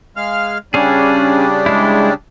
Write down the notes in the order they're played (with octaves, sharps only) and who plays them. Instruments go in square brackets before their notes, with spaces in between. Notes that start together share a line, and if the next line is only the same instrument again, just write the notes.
[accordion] G#3 F5 F6
[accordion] C#3 G3 D4 [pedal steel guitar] C#4 G#4
[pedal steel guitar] G#3 E4